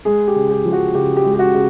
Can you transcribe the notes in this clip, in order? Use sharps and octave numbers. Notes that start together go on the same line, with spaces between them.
G#3 G#4
G4
C#3
G4
F3
F#4
C#3 G4
G4
G#3
G4
F#4
C#3